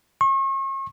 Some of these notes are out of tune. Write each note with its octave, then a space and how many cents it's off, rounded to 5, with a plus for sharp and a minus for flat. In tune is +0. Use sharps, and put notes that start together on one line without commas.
C#6 -40